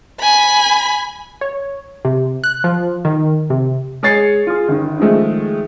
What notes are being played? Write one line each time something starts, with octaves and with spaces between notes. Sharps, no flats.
G#5 B5
C#5
C3
F#6
F3
D#3
C3
G#3 G#4 C#5 A6 C7 C#7
F4 G#4
G1 D#3
D#3 F3 G#3 A3